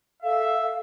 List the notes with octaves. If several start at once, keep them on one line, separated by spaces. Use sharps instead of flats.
A4 E5 F5